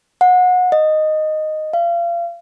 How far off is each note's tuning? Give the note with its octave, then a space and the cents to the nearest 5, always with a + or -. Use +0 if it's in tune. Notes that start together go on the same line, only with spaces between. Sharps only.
F#5 -25
D#5 -5
F5 -30